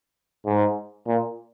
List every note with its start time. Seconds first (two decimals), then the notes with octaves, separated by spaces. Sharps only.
0.46 G#2
1.07 A#2